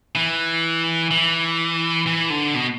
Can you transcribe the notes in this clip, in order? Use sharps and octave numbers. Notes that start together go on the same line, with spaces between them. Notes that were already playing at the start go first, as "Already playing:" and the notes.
E3
E3
E3
D3
B2